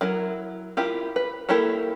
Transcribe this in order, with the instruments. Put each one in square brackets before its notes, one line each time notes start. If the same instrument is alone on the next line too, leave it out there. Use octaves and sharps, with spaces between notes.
[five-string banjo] F#3 E4 A#4
E4 F4 G4 A#4
B4
A#3 E4 G4 A4 A#4